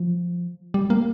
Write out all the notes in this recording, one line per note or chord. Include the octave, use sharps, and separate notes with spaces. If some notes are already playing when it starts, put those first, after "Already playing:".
Already playing: F3
G3
A#3